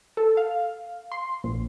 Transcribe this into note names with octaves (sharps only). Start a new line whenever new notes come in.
A4
F5
C6
A#1